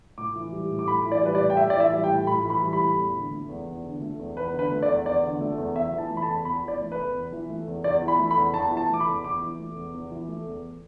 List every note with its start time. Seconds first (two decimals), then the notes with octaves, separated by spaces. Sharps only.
0.17 A2 D6
0.35 E3
0.52 G3
0.71 A2
0.79 D6
0.87 A2 B5
1.05 E3
1.12 D5
1.23 G3 B4
1.35 D5
1.40 A2
1.50 G5
1.57 A2 E5
1.70 D5
1.75 E3 E5
1.93 G3
2.04 G5
2.10 A2
2.27 A2 B5
2.45 E3
2.50 B5
2.62 G3
2.73 B5
2.80 A2
2.97 E2
3.15 D3
3.31 A3
3.49 E2
3.67 E2
3.84 D3
4.01 A3
4.19 E2
4.36 E2 B4
4.53 D3
4.59 B4
4.72 A3
4.82 D5
4.88 E2
5.06 E2 D5
5.23 D3
5.41 A3
5.58 E2
5.75 E2 E5
5.93 E3
5.98 A5
6.10 A3
6.17 B5
6.23 A5
6.27 E2
6.45 E2 B5
6.63 E3 D5
6.81 A3
6.92 B4
6.98 E2
7.14 E2
7.32 E3
7.49 A3
7.67 E2
7.84 E2 D5
8.02 E3
8.08 B5
8.19 A3
8.31 B5
8.37 E2
8.54 E2 A5
8.71 E3
8.77 A5
8.89 A3 D6
9.00 B5
9.07 E2
9.24 E2 D6
9.41 E3
9.59 A3
9.76 E2
9.94 E2
10.11 E3
10.28 A3
10.46 E2